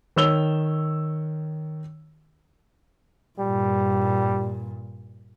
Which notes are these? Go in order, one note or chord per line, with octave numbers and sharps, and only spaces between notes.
D#3 C#5 E6 F7 G7
G2 A#2 G3